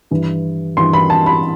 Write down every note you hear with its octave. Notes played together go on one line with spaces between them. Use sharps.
G2 E3
G2 E3 C6
B5
A5
B5